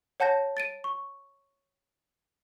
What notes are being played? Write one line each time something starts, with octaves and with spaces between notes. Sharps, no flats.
C#5 F#5 A5 G6 A#6
A6 D7 D#7
C#6